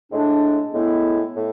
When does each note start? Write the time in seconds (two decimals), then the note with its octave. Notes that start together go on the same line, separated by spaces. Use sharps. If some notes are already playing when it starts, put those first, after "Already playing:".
0.11 A2 G#3 D4
0.73 A2 G#3 B3 E4
1.35 A2